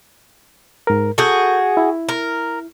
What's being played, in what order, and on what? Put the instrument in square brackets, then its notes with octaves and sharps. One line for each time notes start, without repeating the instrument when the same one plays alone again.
[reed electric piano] G#2 A#4
[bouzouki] F#4 G#4 [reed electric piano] A4 G6
[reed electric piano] E4
[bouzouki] A#4